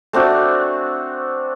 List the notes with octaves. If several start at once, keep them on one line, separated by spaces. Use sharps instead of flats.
A3 C4 D4 F#4